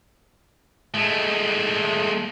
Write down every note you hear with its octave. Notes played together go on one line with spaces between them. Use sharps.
G#3 A3